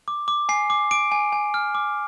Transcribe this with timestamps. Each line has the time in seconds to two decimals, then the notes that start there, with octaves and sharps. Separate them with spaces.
0.08 D6
0.28 D6
0.49 G#5 C7
0.70 D6
0.91 D6 D7
1.12 G#5
1.32 G#5
1.54 F6
1.75 D6